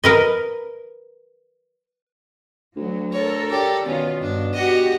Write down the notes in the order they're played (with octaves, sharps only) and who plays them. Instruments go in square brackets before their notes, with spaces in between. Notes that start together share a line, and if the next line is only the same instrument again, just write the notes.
[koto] A#4 B4 D#5
[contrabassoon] D2 [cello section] F#3
[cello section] A4 A#4 [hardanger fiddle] C#5
[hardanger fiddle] G4 D5
[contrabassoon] B2 [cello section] D#3 B3 F4 [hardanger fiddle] C#4
[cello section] G2 [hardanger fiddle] D4
[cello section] B3 F#4 G4 [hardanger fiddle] D#5 F#5